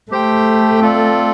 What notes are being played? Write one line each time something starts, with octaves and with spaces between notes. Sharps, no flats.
A3 G4 C5 G5
C4 F4 A4 D5